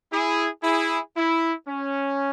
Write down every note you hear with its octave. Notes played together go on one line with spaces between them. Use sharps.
E4 G#4
E4 G#4
E4
C#4